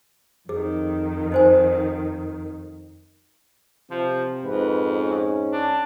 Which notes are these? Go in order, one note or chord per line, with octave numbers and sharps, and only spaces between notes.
F2 D#3 G#4
D#4 C5 G#5
C3 F3
F2 G#2 B4
C#4
D4